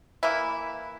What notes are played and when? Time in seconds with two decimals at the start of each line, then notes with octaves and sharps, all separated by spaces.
0.23 E3 A#3 E4